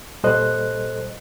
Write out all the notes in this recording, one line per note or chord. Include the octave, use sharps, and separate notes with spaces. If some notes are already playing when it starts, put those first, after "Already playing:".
A#2 G3 A4 C5 D#5 F#6